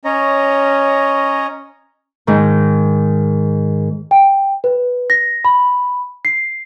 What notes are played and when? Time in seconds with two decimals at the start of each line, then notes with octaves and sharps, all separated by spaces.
0.05 C#4 C#5 D#5 A#5
2.27 G#2 D#3
4.11 G5
4.64 B4
5.10 A#6
5.45 B5
6.25 C7